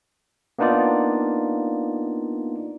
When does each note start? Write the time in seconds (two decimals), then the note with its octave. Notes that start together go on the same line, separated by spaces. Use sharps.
0.59 A#3 B3 D4 D#4 F4 D5